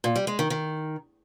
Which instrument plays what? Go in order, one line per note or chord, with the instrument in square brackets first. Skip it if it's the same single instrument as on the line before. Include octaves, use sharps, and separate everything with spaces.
[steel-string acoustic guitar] A#2
G3
G#3
D#3
D#3